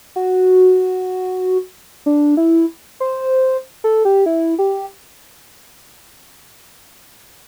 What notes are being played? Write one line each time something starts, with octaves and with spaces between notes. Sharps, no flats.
F#4
D4
E4
C5
A4
G4
E4
G4